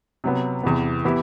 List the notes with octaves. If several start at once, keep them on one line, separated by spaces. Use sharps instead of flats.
C3 F#3 B3
E2 C3 E3 B3
E3 B3 E4 G4